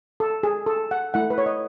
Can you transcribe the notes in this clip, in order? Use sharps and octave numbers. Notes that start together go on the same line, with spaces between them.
A4
G#4
A4
F#5
A3 E4 F#5
B4
C#5
D#5